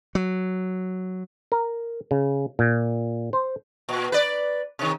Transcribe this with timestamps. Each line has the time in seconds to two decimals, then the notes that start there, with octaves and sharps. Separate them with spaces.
0.15 F#3
1.52 A#4
2.11 C#3
2.59 A#2
3.33 C5
3.89 A#2
4.12 B4 D5
4.79 C3 D#3